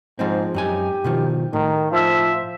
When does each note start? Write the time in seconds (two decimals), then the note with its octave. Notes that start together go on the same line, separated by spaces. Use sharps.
0.19 G#2 F3 G#3 C4
0.54 F#2 D#4 G4 G#5
1.04 B2 D#3 F3
1.53 A2 D#3
1.92 F3 E5